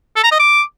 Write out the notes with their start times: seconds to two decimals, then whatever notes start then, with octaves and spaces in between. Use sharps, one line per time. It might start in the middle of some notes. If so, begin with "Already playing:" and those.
0.16 A4
0.24 A#5
0.31 D#5
0.39 D6